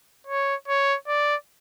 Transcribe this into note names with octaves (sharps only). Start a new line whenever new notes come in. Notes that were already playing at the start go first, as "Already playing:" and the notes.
C#5
C#5
D5